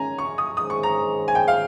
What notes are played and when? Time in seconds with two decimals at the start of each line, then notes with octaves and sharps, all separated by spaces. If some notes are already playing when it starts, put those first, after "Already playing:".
Already playing: D#3 G#3 C#4 G#5 A#5
0.18 C#6
0.38 D#6
0.57 D#3 G#3 C#4 G#4 C5 D#6
0.70 C#6
0.83 A#5
1.28 G#5
1.35 G5
1.48 F5